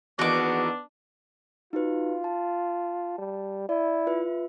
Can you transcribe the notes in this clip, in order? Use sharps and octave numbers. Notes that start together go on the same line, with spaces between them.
E2 D#3 A#3 B3 D4 F#4 D6
D#4 F4 F#4 B4
A5
G3
E4 D5
F4 B4 E5